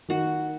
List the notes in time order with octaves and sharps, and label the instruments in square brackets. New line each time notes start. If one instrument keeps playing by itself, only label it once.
[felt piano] D#3 [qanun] F#4